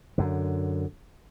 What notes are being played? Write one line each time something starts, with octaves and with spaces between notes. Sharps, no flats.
F#2 D3